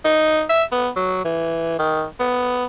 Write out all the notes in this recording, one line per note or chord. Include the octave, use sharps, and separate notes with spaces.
D#4
E5
B3
F#3
E3
D#3
B3